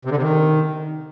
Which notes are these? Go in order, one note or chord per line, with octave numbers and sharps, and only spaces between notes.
C3
D3
C3
D#3